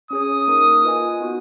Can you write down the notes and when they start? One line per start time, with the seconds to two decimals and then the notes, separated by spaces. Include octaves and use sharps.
0.11 C#4 G#4 C#5 D#6
0.47 A#3 D#4 A#4
0.83 F4 B4 D#5 G#5
1.20 B3 D#4 F#4